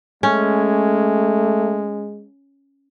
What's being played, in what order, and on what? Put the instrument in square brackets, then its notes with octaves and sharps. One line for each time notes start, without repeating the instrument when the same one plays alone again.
[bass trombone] G#3 [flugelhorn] A3 [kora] C#4